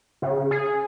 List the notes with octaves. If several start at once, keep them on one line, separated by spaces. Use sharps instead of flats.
C#3
G#4